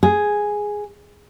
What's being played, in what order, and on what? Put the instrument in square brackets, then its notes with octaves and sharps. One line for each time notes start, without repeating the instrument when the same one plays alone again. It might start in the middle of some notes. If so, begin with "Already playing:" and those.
[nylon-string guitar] G#4